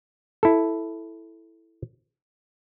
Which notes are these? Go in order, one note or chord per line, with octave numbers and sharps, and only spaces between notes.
E4 A4